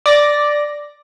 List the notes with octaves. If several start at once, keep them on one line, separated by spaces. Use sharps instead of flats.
D5 A#6